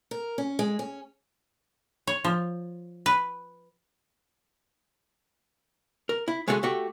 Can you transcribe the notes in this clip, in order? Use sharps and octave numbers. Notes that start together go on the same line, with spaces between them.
A#4
C#4
G#3
C#4
C#5
F3
B4
A#4
E4
G#3 A3 B3 F4 F#4 G#4
A3 F#4 G4